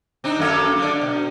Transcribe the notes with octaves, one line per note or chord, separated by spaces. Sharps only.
C4 D4 D#4
F#2 A#3 A4
D3 D5
B2